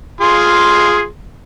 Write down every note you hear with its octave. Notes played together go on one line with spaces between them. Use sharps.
F4 G#4 C6